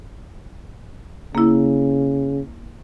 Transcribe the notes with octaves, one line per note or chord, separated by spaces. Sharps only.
C#3 A#3 E4